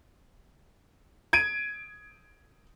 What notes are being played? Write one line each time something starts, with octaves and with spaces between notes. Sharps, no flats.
G#6 D7 D#7